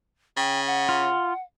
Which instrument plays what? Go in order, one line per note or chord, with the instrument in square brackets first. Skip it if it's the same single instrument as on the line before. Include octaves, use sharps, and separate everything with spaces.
[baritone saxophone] C#3 [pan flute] G5
[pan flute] F#5
[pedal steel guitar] F4